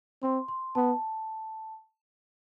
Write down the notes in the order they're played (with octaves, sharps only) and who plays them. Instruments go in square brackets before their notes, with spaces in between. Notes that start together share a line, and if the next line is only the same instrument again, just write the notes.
[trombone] C4 [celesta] C6
[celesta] C6
[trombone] B3 [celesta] A5